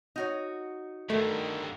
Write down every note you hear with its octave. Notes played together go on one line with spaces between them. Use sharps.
D#4 F#4 C#5
G2 D3 D#3 A3